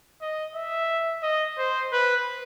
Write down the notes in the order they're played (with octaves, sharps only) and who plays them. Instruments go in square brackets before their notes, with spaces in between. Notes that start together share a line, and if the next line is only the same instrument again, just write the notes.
[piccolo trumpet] D#5
E5
D#5
C5
B4